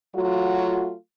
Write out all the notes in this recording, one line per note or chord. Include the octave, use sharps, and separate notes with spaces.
F#3 A3 F4 F#4